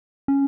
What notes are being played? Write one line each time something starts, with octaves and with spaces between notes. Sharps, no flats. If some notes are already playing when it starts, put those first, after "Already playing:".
C#4